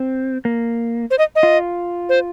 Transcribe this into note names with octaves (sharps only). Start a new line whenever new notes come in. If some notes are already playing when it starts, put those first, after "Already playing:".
Already playing: C4
A#3
C5
D#5
D#5
F4
C5